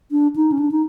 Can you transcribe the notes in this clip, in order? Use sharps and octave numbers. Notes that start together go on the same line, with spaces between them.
D4
D#4
C#4
D4
D#4